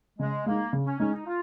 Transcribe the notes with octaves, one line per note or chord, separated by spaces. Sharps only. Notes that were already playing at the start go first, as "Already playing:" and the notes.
C#3 G#3
G#3 A#3 D#4
C#3
C#4
G#3 C#4 D#4
D#4
F4